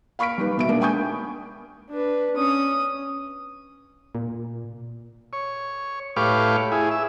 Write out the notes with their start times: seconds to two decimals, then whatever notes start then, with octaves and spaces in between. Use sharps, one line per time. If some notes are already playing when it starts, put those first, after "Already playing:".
0.19 F5 B5 C#6 F6 B6 D7
0.38 G3 D#4 B4
0.57 B2 E5 D7
0.69 G#3 A#3 D4
0.81 G5 G#5 B5 C#6 D#6 G6
1.90 D4 B4
2.36 C#4 D#6
4.15 A#2
5.33 C#5
6.16 A2 G4 B4 C#5 F5 D6
6.72 E4 G#4
6.91 E5